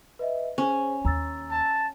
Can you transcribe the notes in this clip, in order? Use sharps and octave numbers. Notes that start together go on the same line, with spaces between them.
B4 D#5 E5
C#4 G#4 C5
D#2 A#5 E6 A6
A5